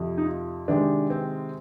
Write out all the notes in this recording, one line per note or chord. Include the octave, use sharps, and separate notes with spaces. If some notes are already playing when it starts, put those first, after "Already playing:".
Already playing: F2 C3 F3
D#4
F4
C3 D#3 G#3 D4
C4